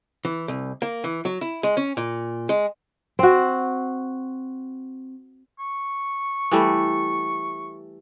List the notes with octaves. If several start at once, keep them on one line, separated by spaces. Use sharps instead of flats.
E3
C2
A#3
E3
F#3
E4
G#3
C#4
A#2
G#3
C4 F#4
C#6
E3 G3 A3